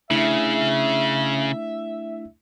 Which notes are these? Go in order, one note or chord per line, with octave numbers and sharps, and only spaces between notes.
C#3 A3 D4 E4 E5